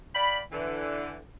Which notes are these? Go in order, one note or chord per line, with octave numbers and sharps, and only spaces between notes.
D5 F5 G5 B5
D3 E3